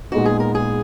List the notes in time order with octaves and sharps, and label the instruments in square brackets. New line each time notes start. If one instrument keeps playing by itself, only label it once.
[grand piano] A#2 G#3 B3 D#4 [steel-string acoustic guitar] F#4
[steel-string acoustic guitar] G#4
A#4
G#4